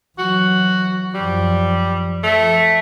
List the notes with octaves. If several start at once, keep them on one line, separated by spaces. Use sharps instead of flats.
E3 F#3 F#4
F#2 F3 G3
F3 A3